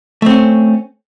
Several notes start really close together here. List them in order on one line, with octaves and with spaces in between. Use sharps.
A3 C4 C#4